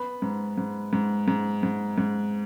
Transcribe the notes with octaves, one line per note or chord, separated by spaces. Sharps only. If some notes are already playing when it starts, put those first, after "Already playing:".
Already playing: B3 B5
G#2
G#2
G#2
G#2
G#2
G#2